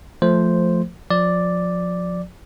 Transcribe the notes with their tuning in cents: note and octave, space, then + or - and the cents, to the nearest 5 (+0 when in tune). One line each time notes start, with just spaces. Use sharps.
F3 +5 A3 +0 C5 +0
F3 +30 D5 +0